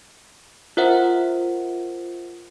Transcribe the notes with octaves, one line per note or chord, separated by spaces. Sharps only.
F4 A#4 C5 E5 F#5